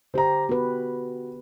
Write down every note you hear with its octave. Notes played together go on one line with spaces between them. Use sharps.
D3 G4 C5 A#5
B3 F#4 B4